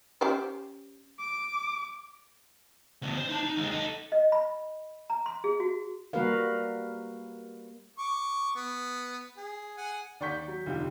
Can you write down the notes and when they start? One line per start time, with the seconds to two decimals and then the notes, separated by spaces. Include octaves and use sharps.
0.21 C#4 G4 C5
1.19 D6
3.02 D2 B2
3.17 C5
3.29 D#4 A5
3.43 D#4
3.56 D#2 G#3
3.71 D#4 A4
4.12 D#5
4.32 B5
5.10 A#5
5.26 C6
5.44 G#4
5.60 F#4
6.13 G3 A#3 F#4 A#4 B4 F5
7.98 C#6 D6
8.56 B3
9.37 G#4
9.77 G#4 F#5 G#5
10.20 D#2 D5 F#5 C#6 G6 B6
10.48 F#3
10.66 F1 D#2 D3 F4 G4